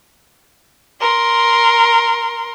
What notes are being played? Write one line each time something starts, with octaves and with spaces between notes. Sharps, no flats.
A#4 C6